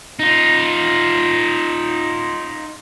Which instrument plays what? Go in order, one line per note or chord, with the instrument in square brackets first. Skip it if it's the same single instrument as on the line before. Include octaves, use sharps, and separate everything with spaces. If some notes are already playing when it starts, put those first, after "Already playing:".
[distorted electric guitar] D#4 F4